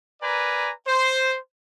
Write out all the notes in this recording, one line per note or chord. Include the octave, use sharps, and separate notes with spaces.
A#4 B4 D5 G#5 A#5
C5